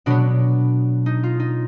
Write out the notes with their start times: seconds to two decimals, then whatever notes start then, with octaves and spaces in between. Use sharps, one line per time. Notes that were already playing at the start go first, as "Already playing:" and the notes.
0.06 B2 F#3 B3 D4
1.06 D#4
1.23 F4
1.40 D#4